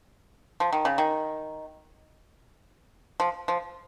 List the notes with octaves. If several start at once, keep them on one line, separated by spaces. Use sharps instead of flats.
F3
D#3
C#3
D#3
F3
F3